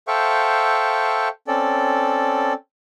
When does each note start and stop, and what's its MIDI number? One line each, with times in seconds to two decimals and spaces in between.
0.08 1.28 69
0.08 1.28 72
0.08 1.28 76
0.08 1.28 77
0.08 1.28 79
0.08 1.28 85
1.48 2.53 60
1.48 2.53 61
1.48 2.53 69
1.48 2.53 74